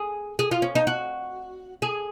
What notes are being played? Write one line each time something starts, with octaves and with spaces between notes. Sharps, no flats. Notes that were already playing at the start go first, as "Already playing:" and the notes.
Already playing: G#4
G#4
F4
C#4
D#4
F#4
G#4